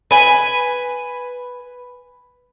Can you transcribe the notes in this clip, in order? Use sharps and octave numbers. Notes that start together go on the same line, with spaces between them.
B4 G#5